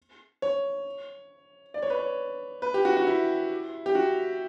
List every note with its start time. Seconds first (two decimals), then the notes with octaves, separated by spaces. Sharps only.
0.42 C#5
1.74 D5
1.82 C#5
1.90 B4
1.99 C#5
2.62 B4
2.74 G4
2.85 F#4
2.97 F#4
3.07 E4
3.86 G4
3.95 F#4